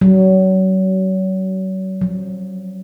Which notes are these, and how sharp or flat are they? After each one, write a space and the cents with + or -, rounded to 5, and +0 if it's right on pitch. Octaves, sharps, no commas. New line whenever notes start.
F#3 +35
F#3 -45